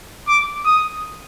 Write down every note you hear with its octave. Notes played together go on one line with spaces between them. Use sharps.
D6
D#6